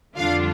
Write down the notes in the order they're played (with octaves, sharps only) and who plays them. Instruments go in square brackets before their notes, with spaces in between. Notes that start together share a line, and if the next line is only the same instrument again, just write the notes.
[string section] F2 D3 G3 D4 F4 F5